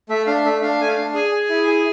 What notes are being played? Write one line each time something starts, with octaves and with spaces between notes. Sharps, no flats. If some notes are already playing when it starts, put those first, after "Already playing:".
A3 E5
D4 F5
A3 E5
D4 F5
A3 G#5
F5
D4
G#4 G#5
G#4
E4
G#4